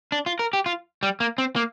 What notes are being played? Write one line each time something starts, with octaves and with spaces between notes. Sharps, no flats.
D4
F4
A#4
G4
F4
G3
A#3
C4
A#3